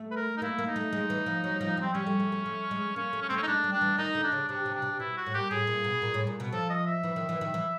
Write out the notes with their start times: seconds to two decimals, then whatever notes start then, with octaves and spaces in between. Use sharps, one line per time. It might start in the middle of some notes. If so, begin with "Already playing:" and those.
Already playing: A3
0.11 B4
0.16 A#4
0.37 D#4
0.42 A#3 E4
0.59 A#3
0.67 D#4
0.76 A3
0.93 G#3
1.10 E3
1.26 F3
1.44 F#3
1.61 F3
1.77 G3 C4
1.94 G3 C#4
2.07 A3
2.20 A3
2.32 A3
2.46 A3
2.71 G#3
2.96 A#3 C#4
3.13 A3
3.21 C#4
3.29 A3 C4
3.37 C#4
3.43 D#4
3.47 G#3 D4
3.64 G3
3.73 D4
3.81 E3
3.98 D#3 D#4
4.15 D3
4.24 D4
4.32 C#3
4.49 C3 D4
4.66 C3
4.74 D4
4.82 C3
5.00 B2 E4
5.17 F#4
5.26 A2
5.34 A#2 G4
5.51 A2 G#4
5.67 A#2
5.84 B2
6.02 A#2
6.14 A2
6.27 A#2
6.40 B2
6.52 F3 A4
6.70 D#5
6.86 E5
7.03 E3
7.16 D#3
7.29 E3
7.41 D#3
7.54 E3